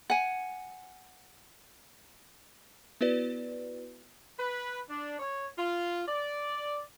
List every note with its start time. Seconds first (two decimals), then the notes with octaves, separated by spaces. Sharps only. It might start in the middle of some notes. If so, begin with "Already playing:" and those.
0.10 F#5 G#5
3.01 B3 E4 F#4 B4 D5
4.39 B4
4.88 D4
5.19 C#5
5.58 F4
6.07 D5